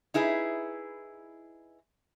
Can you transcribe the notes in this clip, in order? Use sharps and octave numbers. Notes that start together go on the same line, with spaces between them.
D#4 E4 G#4 B4